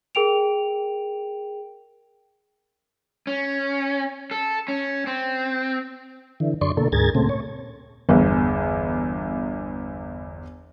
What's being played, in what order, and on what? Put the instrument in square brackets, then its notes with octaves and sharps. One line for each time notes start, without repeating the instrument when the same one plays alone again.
[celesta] G#4 A#4 G5 D7 F7
[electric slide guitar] C#4
A4
C#4
C4
[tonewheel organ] D3 E3
F#2 D3 D5 C6 C#6
B2 D3 A#3 A4
D2 G#2 G#4 A#4 G#6 A6
A#2 C#3 A3 C4
C#5
[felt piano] G1 E2